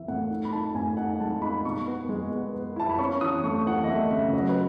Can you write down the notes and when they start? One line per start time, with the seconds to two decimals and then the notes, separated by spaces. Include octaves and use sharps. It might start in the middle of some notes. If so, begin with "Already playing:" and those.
Already playing: E3 E5
0.08 A2 F#5
0.30 D#4
0.45 B5
0.52 D#4 A5
0.74 A2 G#5
0.97 D#4 F#5
1.20 G#3 A5
1.42 D#4 B5
1.64 B2 C#6
1.87 B3
2.09 G#3
2.31 B3
2.54 B3
2.76 E4 A5
2.89 B5
2.99 C#4 C#6
3.21 E3 D#6
3.44 A3 C#6
3.66 E3 F#5
3.84 D#5
3.88 A3 E5
4.11 C#3 E5
4.33 F#3 D#5
4.49 B4